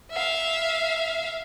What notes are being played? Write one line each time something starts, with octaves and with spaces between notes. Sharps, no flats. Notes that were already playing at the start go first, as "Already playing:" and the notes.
E5 F5